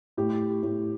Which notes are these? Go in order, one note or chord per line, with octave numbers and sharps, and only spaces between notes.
A2 G4
A2